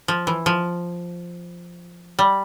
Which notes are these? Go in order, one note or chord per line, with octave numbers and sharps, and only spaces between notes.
F3
E3
F3
G3